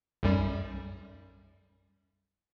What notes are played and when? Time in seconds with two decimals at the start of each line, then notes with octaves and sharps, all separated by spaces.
0.23 B1 F#2 G3